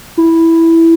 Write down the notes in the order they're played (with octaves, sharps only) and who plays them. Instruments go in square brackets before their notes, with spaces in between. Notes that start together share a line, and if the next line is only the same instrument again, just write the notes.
[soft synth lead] E4